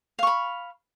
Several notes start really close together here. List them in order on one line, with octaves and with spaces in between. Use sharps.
F5 C#6 B5